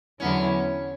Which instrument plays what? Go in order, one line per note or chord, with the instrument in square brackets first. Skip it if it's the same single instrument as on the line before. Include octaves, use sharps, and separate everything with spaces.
[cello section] E2 D3 F#3 B3 E4 [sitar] C#4